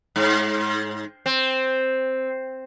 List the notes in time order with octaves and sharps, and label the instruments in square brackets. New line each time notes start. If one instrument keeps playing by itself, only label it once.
[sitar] G#2
C4